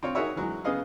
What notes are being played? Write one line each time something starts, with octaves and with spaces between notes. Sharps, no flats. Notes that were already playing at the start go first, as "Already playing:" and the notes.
C4 F4 C#5
D#4 F#4 G#4 A#4 C#5 E5
E3 F#3 G#3
C#3 B3 G#4 D#5 F5